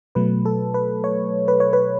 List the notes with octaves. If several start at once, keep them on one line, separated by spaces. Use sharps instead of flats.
B2 F#3 A3 B4
A4
B4
C#5
B4
C#5
B4